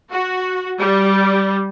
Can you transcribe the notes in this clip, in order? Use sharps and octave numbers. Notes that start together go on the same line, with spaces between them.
F#4
G3